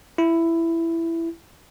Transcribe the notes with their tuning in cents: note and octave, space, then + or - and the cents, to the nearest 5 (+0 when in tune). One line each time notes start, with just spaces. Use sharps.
E4 +10